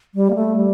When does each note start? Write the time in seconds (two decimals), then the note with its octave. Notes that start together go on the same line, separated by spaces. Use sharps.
0.15 G3
0.30 A#3
0.35 A3
0.56 G3